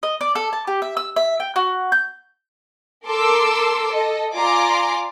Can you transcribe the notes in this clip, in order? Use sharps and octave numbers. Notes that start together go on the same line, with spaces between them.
D#5
D5
A4
A5
G4
E5
E6
E5
G5
F#4
G6
A4 A#4 C6 D6 E6
A4 D#5
F4 D5 G#5 A#5 C6 D6